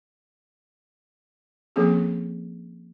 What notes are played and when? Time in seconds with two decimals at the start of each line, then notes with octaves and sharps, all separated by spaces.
1.76 F3 A#3 C4 C#4 G#4 A4